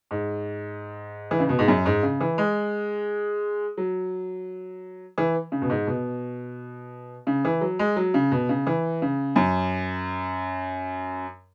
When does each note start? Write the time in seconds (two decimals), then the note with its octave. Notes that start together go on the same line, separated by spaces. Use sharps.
0.11 G#2
1.31 E3
1.40 C#3
1.49 B2
1.59 G#2
1.68 F#2
1.86 G#2
2.03 C#3
2.21 E3
2.38 G#3
3.77 F#3
5.18 E3
5.52 C#3
5.62 B2
5.70 G#2
5.87 B2
7.27 C#3
7.45 E3
7.61 F#3
7.79 G#3
7.96 F#3
8.14 C#3
8.32 B2
8.49 C#3
8.67 E3
9.02 C#3
9.36 F#2